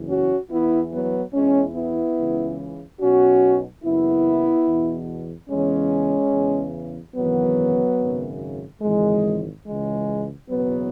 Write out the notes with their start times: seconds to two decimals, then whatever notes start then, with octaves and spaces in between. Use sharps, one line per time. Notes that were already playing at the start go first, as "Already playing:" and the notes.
Already playing: F#1 E2 E3
0.09 C#4 F#4
0.50 E2 E3 B3 E4
0.92 F#3 B3
1.33 E2 E3 G#3 C#4
1.75 B3 E4
2.17 C#2 C#3 E3
3.00 B1 B2 C#4 F#4
3.83 F#1 F#2 C#3 E3 B3 E4
4.66 E2 B2
5.49 E2 C#3 E3 G#3 C#4
6.32 E2 C#3 E3
7.15 G#1 F#2 C#3 E3 F#3 B3
7.99 G#1 F#2 C#3
8.82 G#1 F#2 C#3 E3 G#3
9.65 C#2 C#3 E3 G#3
10.49 F#1 E2 B2 F#3 B3